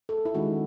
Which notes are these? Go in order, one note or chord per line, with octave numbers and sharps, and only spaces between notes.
A4
E4
D#3 G#3 C#4 F#4